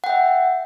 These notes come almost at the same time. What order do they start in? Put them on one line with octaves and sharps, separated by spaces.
F#5 G5 E5